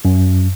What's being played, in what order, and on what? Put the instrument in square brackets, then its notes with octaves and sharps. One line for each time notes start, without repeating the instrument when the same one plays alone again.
[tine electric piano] F#2